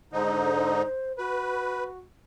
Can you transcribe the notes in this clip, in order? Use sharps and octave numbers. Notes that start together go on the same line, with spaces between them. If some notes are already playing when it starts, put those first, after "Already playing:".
G#2 D3 D#4 C5
F#4 B4